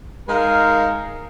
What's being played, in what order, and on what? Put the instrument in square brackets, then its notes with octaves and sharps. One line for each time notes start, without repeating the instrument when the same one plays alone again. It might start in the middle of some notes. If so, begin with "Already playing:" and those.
[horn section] G#3 D#4 A#4 F5